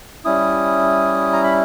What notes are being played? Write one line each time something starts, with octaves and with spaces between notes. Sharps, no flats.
G3 C#4 E4 D#6
A#5
B5